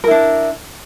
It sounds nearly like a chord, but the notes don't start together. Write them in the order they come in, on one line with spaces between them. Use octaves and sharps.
A#4 E4 D4